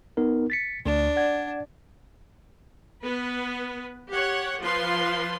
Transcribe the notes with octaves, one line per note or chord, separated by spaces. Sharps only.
B3 D#4 A#4
A6 B6 C#7
D2 D4
D5 F#5 G#6
B3 B4
G4 C#5 F#5
F3 F4 B4 C6